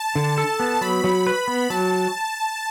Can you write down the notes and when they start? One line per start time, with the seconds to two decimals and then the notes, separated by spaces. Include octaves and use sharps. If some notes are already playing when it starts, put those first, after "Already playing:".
Already playing: A5
0.15 D3
0.38 A4
0.60 B3
0.81 F#3 B5
1.04 F#3
1.27 B4
1.48 B3
1.70 F#3 A5